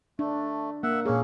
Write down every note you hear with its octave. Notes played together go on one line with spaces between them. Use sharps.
A3 D4
A#3 E5 F#5
A#2 A#3 C#4 G#4